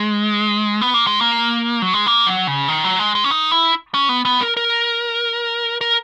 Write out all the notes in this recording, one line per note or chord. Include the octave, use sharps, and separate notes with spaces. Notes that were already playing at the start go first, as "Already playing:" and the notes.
Already playing: G#3
B3
A#3
G#3
A#3
F#3
G#3
A#3
F#3
C#3
D#3
F#3
G#3
G#3
C#4
D#4
E4
C#4
B3
B3
A#4
A#4
A#4